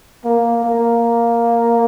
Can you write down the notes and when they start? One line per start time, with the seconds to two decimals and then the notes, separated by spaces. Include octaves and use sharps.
0.25 A#3
0.65 A#3